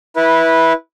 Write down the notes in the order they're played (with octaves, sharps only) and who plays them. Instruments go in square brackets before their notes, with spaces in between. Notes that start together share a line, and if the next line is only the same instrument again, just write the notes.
[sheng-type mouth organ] E4 B4